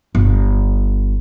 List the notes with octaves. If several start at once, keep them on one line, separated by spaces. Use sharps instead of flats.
G1